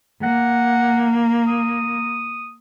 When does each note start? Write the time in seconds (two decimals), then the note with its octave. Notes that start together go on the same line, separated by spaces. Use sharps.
0.23 A#3 F#5
1.47 D#6